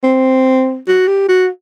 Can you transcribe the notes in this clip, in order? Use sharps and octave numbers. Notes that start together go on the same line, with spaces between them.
C4
F#4
G4
F#4